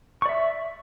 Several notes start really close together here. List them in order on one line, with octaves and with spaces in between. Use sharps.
C#6 D5 E5